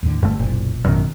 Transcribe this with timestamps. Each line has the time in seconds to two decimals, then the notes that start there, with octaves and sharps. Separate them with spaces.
0.03 D#2 A2 D3
0.23 G1 G2 D3 A3
0.39 F#1 B1 A#2
0.85 A1 F#2 B2 D#3